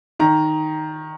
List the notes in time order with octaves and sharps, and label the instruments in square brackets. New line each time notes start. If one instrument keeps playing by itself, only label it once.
[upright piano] D#3 A#5